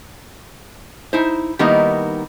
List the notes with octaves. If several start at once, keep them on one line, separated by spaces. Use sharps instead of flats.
D#4 E4 C5
D#3 G3 A#3 B3 D#4 E4